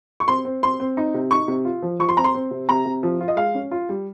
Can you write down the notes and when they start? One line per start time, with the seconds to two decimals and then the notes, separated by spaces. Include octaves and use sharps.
0.20 C#6
0.28 C4 C6
0.45 C4
0.63 C4 C6
0.80 C4
0.97 D#4
1.14 C3
1.31 D#4 C#6
1.48 C3
1.65 F4
1.82 F3
1.99 F3 C#6
2.09 C6
2.16 C4 A#5
2.24 C6
2.35 C4
2.51 C3
2.69 C3 A#5
2.85 C3
3.03 F3
3.21 F4
3.28 D#5
3.37 G#3 F5
3.54 C#4
3.71 F4
3.89 G3